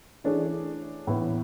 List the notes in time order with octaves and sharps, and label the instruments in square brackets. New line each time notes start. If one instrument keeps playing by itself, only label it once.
[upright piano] E3 A3 D4 G#4 C#5
A2 E3 B3